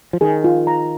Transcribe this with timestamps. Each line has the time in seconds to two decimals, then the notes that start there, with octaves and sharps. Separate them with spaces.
0.13 F3
0.21 D#3 G#4
0.44 F4
0.67 A#5